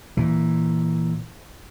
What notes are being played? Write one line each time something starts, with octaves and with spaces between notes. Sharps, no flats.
A#2 E3